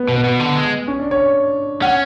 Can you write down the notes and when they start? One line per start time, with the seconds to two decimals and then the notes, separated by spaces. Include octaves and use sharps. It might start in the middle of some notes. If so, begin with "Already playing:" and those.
Already playing: B3
0.09 B2
0.16 B3
0.24 B2
0.40 D3
0.55 G#3
0.88 C#4
1.00 D4
1.11 C#5
1.82 C#4 F#5